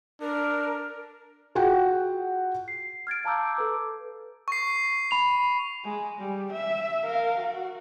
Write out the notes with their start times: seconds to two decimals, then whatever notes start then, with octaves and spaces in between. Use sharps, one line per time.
0.21 D4 A#4
1.55 F4 F#4 G#4 F#5 G5
2.68 C7
3.07 F6 G#6 A6 D7
3.24 F5 A5 A#5 D6 E6 G6
3.56 A4 B4 D6
4.48 C#6 C7
5.11 B5 F7
5.84 G#3
6.19 G3
6.52 E5
7.05 A#4 F5
7.40 F#4